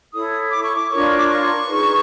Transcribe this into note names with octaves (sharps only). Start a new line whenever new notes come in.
E4 A4 C#5 D#6
D6
C#6
D6
D4 F4 A#4 C#5 C#6
D6
C#6
D#4 G#4 B4